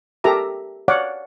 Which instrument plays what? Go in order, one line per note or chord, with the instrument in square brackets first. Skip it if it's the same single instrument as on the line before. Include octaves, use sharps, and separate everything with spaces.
[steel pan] G4 A4 A#4 E5 A#5 D6
C#5 D5 F5 F#5 D6